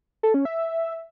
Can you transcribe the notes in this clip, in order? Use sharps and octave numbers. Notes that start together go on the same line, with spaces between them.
A4
C#4
E5